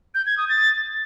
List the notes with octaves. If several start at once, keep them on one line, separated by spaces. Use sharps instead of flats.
G6
G#6
D#6
A6